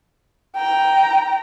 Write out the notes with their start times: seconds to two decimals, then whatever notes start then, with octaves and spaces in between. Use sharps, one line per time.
0.56 G5 A#5